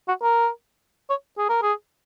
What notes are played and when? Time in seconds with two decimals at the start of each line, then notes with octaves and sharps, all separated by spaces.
0.08 F#4
0.23 A#4
1.10 C#5
1.38 G#4
1.50 A#4
1.62 G#4